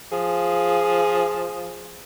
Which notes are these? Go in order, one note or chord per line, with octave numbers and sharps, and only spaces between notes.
F3 G#4